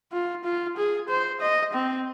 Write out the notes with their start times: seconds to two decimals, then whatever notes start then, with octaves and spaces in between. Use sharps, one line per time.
0.12 F4
0.44 F4
0.77 G#4
1.09 C5
1.41 D#5
1.73 C4